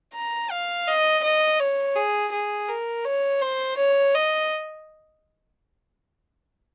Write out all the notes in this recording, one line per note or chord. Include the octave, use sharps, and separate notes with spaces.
A#5
F5
D#5
D#5
C#5
G#4
G#4
A#4
C#5
C5
C#5
D#5